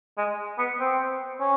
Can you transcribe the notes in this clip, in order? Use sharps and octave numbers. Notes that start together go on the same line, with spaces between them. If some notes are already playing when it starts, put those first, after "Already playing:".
G#3
B3
C4
C#4